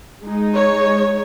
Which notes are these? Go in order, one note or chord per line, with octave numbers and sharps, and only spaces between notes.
G#3 D#4
C#5